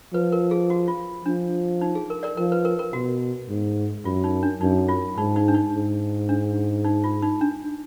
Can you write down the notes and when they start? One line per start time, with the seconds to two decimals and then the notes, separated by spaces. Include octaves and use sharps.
0.13 F3 B4
0.32 A#4
0.51 G#4
0.70 F#4
0.88 F4
1.25 F3 D4
1.81 D#4
1.95 G#4
2.10 A#4
2.23 A#4 D5
2.37 F3 A#4
2.52 B4
2.65 A#4
2.79 A#4
2.93 B2 F#4
3.49 G#2
4.05 F#2 F4
4.24 D#4
4.43 D4
4.61 F#2 D#4
4.89 F4
5.17 G#2 D#4
5.36 D#4
5.48 D4
5.54 D#4
5.73 G#2
6.29 D4
6.85 D#4
7.04 F4
7.22 D#4
7.41 D4